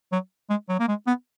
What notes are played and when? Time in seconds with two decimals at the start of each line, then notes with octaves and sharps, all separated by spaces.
0.12 F#3
0.50 G#3
0.69 F#3
0.79 A#3
0.88 G#3
1.07 B3